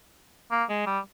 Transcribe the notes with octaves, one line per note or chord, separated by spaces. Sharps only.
A#3
G#3
G3